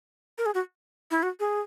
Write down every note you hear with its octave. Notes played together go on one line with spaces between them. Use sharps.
A#4
G#4
F#4
E4
F#4
G#4